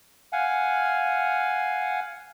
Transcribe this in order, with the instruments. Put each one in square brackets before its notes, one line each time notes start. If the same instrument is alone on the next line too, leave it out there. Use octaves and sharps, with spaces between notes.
[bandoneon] F5 F#5 G#5